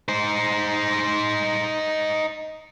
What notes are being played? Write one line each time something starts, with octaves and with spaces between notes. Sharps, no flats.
D#4 C5